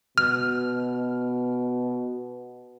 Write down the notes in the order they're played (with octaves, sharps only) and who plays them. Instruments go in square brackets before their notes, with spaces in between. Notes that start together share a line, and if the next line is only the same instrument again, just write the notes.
[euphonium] B2 [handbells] F6